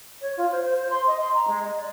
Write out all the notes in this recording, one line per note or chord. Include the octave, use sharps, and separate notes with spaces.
C#5
F4
C5
C5
C5
C6
D#5
C6
A#5
G#3
D#5
D5